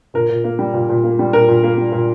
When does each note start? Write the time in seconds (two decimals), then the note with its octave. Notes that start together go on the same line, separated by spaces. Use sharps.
0.14 A#2 A#4
0.29 A#2
0.44 A#3
0.59 G3
0.74 A#2
0.89 A#2
1.04 A#3
1.19 G3
1.33 A#2 A#4
1.48 A#2
1.64 A#3
1.77 G3
1.92 A#2